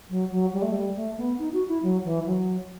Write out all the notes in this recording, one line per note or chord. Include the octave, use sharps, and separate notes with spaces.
F#3
F#3
G3
A3
G3
A3
B3
D#4
F#4
E4
F#3
E3
F#3